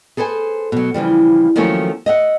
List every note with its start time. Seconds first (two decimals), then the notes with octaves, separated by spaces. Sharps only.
0.17 G#4 A4 B4 C5 G#5
0.72 B2 F#3
0.94 C#3 E3 F3 G3
1.56 D#3 F3 F#3 A3 A#3 C#4
2.06 D#5 E5 F#5